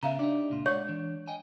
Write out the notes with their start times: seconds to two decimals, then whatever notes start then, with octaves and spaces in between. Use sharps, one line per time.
0.03 C#3 B3 E5 F5 A#5
0.19 D4 D#4 G4 D5
0.50 C#2 A#2 F4
0.66 G#3 C#5 D5 F#5 C#6
0.88 E3 D4
1.28 D#5 G5 G#5